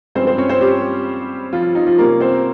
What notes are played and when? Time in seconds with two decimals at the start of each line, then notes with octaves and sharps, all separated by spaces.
0.15 G2 F3 G#3 C4 C#4 C5
0.27 C4 C5
0.38 C#4 C#5
0.49 C4 C5
0.61 G3 G4
1.53 F3 F4
1.75 D#4
1.86 F3 F4
1.98 C3 G3 A#3 C#4 A#4
2.20 C4 C5